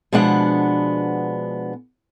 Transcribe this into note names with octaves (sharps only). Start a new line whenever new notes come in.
B2 F3 G#3 B3 D4 F#5